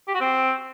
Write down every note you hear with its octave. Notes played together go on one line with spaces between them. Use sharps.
G4
F#4
C4